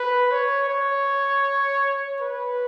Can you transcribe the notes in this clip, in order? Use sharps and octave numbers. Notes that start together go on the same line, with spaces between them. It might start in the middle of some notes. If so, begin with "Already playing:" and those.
Already playing: B4
C#5
C#5
B4